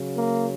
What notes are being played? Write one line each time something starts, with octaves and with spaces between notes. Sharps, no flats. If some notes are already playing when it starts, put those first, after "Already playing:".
Already playing: C#3 F#3
A#3